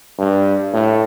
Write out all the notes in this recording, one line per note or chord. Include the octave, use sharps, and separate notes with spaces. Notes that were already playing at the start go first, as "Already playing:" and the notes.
G2
A2